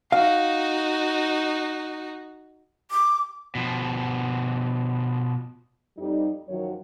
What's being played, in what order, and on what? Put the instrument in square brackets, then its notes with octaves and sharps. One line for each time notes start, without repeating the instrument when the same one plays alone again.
[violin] D#4 F#4 [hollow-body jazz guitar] F5
[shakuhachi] D6
[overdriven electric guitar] B2 F3
[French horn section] F2 G3 D#4
F#2 D#3 F3 F#3 F#4 C#5